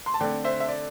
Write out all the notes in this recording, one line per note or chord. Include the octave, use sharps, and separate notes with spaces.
C6
A5
D3 A3 C4 D5 G5
C5 E5
E5
D5